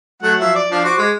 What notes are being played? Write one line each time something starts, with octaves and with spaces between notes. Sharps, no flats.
F#3 A3 F#5
F3 F#3 E5
D5
F3 D4
F#4 C5 D6
G#3